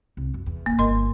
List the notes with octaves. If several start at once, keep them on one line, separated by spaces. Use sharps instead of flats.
C2
F#2
E2
D1 A1 A#3
G1 B3 A#4 D#5 C6